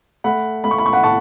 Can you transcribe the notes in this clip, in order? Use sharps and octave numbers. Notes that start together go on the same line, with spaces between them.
A3 F#5 B5
A3 B5
C#6
B5
C#6
F#5 B5
A2 A5 C#6